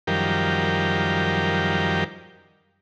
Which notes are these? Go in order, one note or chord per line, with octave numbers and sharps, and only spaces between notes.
F#2 D#3 F3 G3 G4 A#4